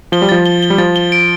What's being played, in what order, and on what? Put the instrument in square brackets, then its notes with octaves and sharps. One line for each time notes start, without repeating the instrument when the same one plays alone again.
[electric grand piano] F3 [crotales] G7
[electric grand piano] G3
[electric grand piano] F3 [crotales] A6
[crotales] G7
G7
[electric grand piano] G3
[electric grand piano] F3 [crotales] A6
[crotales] G7
D7